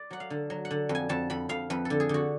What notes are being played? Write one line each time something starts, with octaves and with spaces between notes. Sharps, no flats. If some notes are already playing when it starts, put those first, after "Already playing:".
Already playing: D5
F#3 F#5
F5
D3
F#3
F#5
D3
F2
G#5
F2 A5
F2 B5
F2 F5
F2 B4
D3 A4
G#4
D3 F#4